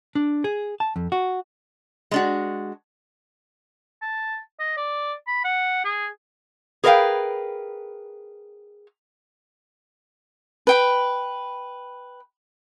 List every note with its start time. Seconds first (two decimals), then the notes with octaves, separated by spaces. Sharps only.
0.15 D4
0.44 G#4
0.80 A5
0.96 F2
1.12 F#4
2.11 G#3 D4 F#4
4.02 A5
4.60 D#5
4.77 D5
5.27 B5
5.44 F#5
5.85 G#4
6.84 G#4 A#4 B4 D#5 F5 G5
10.67 B4 G5 B5